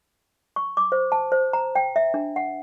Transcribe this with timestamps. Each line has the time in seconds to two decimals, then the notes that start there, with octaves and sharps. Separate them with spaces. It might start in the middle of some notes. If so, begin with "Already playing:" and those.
0.56 C#6
0.77 D6
0.92 C5
1.12 A5
1.32 C5
1.53 A#5
1.75 G5
1.96 E5
2.14 D4
2.36 F#5